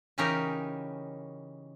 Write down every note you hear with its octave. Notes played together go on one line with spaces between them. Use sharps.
C#3 E3 C#4 D#4 G4 A#4